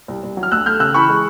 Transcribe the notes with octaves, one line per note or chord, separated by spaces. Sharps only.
C2
C2
F#3
F6
D2 E6 F#6
A3 F6 G6
C#3 E6 F#6
E3 B5 C#6
G#3